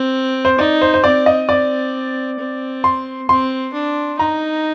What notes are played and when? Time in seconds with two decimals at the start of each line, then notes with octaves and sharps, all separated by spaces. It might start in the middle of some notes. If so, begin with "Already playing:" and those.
Already playing: C4
0.45 C5
0.59 D#4 D5
0.81 C5
0.94 C5
1.04 C4 D5
1.26 D#5
1.49 C4 D5
2.39 C4
2.84 C6
3.29 C4 C6
3.74 D4
4.19 D#4 A#5